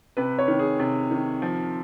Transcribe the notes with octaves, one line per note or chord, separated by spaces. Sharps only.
C3 B4
C#5
D#3
G#4
C3
D#3
F3